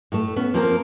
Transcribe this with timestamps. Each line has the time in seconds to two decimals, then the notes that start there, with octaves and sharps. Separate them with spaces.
0.12 A2 A3
0.36 B3 C#4
0.54 F3 A#3 C4 A#4